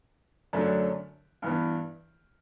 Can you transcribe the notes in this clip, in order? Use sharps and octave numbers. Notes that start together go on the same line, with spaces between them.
F#2 D3 F#3 A3 D4
G2 E3 B3